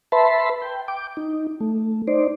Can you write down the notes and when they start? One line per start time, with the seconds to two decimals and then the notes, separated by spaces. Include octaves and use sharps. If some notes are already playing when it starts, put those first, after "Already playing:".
0.12 B4 E5 A5 B5 C6
0.62 G5
0.88 G5 D6
1.17 D#4
1.61 A3
2.07 D#4 C5 D5